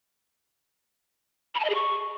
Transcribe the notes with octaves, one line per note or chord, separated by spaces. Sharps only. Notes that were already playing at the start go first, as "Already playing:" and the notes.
B5
A5
D#5
G#4
C#6